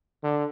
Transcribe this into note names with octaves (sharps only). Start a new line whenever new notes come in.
D3